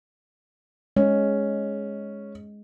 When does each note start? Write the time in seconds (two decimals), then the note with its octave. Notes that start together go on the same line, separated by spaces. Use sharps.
0.96 G#3 C#4